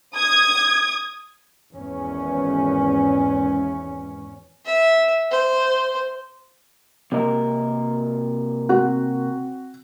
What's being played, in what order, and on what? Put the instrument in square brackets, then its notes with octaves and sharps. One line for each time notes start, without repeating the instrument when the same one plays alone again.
[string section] D#6 G#6
[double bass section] G#1 E2 C#4
[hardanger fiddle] E5
C5
[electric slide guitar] C3 A#3 A#4 [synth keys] C4 D#5
[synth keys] C4 [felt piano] F#4